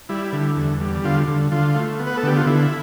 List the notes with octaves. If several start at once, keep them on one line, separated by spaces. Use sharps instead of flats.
G3 E4
D3
E2
G3
D3 F4
D3
D3 F4
A3
B3
B4
A4
D3 G4
F4
D3 E4